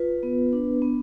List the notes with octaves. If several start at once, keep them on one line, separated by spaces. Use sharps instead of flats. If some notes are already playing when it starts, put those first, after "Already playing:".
Already playing: F4 B4
B3
D4
B3